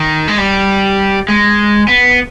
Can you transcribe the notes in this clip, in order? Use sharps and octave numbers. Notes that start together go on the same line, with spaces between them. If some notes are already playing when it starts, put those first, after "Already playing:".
Already playing: D#3
G#3
G3
G#3
B3